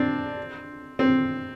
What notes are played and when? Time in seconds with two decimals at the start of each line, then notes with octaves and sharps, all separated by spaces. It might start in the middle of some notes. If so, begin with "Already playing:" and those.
Already playing: C4 D4
0.99 C4